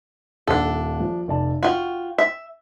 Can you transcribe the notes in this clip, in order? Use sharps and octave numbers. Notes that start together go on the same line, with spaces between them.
D#1 D4 A4 F#5
F3
F1 D5 A5
F4 F#4 G5 C6
E5